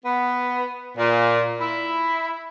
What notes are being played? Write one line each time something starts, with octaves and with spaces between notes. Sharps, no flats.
B3
A#2
E4